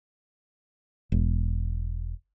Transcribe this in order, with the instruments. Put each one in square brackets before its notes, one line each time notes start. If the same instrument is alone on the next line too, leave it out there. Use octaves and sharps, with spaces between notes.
[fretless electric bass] E1